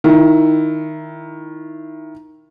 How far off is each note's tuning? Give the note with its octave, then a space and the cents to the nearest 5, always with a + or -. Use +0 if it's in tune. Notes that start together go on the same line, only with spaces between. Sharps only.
D#3 +0 E4 +15